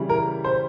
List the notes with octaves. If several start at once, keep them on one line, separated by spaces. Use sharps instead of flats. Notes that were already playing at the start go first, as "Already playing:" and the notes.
Already playing: C#3 E3 G3
A#4
C5